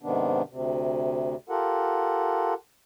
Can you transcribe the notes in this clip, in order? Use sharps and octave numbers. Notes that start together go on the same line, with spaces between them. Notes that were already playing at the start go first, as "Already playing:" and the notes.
G#2 C3 D#3 B3 D4
D2 C3
F4 G4 A4 A#4 F#5